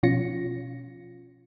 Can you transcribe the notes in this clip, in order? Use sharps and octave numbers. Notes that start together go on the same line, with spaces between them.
B2 F3 C#4 F4 A#6 C#7